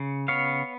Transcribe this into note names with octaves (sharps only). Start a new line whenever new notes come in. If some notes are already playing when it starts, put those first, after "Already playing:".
Already playing: C#3
B3 C#5 F5